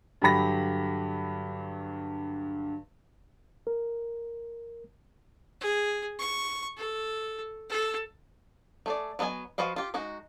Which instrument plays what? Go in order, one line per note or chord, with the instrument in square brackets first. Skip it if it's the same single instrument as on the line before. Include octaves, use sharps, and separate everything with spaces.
[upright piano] G2 D3 F#3 G4 B5 A#6
[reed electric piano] A#4
[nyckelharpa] G#4
C#6
A4
A4
[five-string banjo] A3 G#4 D5
F#3 B3 A4 D#5 G#5
F3 F#4 B4 D#5 F5
F4 G4
G#3 D#4 F#4